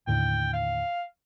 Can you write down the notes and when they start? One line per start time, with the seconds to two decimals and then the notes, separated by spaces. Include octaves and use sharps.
0.07 D#2 A2 D3 G5
0.53 F5